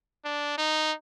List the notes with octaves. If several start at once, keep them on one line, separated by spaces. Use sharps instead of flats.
D4
D#4